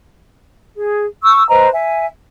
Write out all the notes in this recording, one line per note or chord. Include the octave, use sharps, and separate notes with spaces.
G#4
C#6 E6
B4 C5 D#5 A#5
E5 G#5